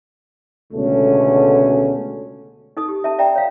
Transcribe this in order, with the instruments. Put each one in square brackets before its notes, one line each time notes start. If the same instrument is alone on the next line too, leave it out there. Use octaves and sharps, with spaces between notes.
[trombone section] C#2 B2 D3 A3 C#4
[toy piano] D#4 A4 D#6
G4
E5 A5
D5 E5 G5 A#5
C#5 F5